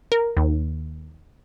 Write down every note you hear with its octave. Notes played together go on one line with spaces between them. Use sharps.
A#4
D#2